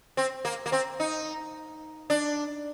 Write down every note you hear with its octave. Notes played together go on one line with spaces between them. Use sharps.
C4
A#3
A#3
C4
D#4
D4